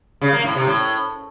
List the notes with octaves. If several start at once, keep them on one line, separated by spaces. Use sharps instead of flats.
C#3
A#3
A2
C3
A2